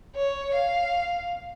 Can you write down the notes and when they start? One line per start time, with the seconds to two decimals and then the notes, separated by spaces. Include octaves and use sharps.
0.16 C#5
0.55 F5